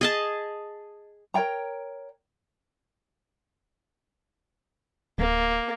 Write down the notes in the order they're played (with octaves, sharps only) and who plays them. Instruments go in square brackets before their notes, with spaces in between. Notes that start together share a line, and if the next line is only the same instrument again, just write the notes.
[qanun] G#4 D#5 A5
[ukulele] A#4 C#5 G5 A#5
[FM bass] D1 [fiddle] A#3